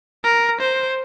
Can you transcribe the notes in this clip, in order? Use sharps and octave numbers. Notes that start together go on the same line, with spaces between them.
A#4
C5